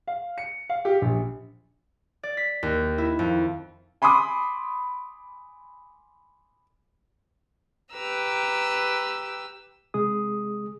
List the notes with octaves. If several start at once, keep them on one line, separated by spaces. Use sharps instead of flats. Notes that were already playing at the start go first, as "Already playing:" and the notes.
F5
C#7
F5
G4
A#1
D5
B6
D#2
E4
F2
G#5 B5 C6 D6 D#6
G4 B4 A#5 E6
C3 G#3 G#4 D#6